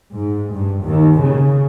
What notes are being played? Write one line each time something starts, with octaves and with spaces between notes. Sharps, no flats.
G#2
G2
D#2
C#3